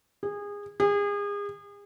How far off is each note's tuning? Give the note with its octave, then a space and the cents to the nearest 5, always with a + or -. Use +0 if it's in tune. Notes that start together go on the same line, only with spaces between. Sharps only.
G#4 -25
G#4 -35